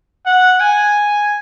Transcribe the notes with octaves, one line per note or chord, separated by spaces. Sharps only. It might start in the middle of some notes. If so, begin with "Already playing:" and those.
F#5
G#5